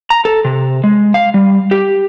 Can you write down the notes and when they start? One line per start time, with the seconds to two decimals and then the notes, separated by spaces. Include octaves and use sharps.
0.10 A#5
0.25 A4
0.45 C3
0.84 G#3
1.14 F5
1.34 G3
1.71 G4